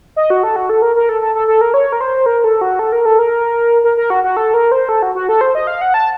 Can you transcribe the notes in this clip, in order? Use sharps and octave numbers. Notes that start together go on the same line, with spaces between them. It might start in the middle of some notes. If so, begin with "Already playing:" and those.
D#5
F#4
A4
F#4
A4
A#4
A#4
A4
A4
A4
A4
A#4
C#5
A#4
C5
A#4
A4
F#4
A4
A#4
A4
A#4
A#4
A#4
F#4
F#4
A4
A#4
C5
A4
F#4
F#4
A4
C5
D#5
F5
F#5
A5